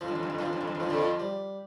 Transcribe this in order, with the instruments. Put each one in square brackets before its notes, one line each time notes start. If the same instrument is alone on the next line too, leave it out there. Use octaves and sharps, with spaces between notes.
[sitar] F2 [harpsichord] F3
[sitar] G2
F2
G2
F2
[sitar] G2 [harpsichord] F3
[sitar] F2
G2
F2
G2
F2
[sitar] G2 [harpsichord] F3
[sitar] F2 [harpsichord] D3
[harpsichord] F3
G3